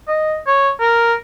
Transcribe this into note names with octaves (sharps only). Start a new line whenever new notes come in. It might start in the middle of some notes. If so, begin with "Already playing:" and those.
D#5
C#5
A#4